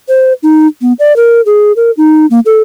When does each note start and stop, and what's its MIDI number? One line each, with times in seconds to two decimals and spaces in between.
0.09 0.33 72
0.43 0.67 63
0.82 0.93 59
0.99 1.15 74
1.16 1.41 70
1.46 1.72 68
1.76 1.91 70
1.97 2.26 63
2.31 2.40 58
2.46 2.62 69